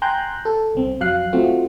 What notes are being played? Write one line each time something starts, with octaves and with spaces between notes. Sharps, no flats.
G5 G#5 A#5 C6 F#6 G6
A4
C2 C4
F2 F#3 F5 F#6 C7
A3 C4 F4 F#4